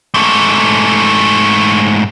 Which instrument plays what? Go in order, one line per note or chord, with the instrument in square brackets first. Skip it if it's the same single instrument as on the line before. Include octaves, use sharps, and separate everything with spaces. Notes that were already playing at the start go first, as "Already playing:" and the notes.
[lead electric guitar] G#2 A3